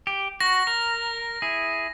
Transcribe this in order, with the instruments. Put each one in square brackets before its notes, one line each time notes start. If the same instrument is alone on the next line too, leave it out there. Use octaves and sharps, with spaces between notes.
[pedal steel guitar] G4
[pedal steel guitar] F#4 [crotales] A#6
[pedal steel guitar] A#4
E4 G#4